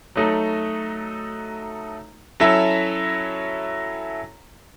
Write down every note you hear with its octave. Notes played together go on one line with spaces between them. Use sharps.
F#3 A3 D#4 A4
F#3 C#4 E4 A4 E5